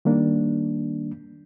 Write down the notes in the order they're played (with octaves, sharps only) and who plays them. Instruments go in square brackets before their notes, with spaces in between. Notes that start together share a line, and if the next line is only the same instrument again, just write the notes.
[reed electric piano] D#3 G3 A#3 D4